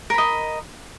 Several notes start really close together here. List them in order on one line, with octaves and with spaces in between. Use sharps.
A#4 B5 D#5